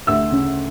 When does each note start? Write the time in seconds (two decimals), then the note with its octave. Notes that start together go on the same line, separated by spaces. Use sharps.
0.07 D2 E5 E6
0.32 C#3